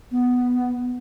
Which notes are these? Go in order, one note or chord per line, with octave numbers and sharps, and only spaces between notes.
B3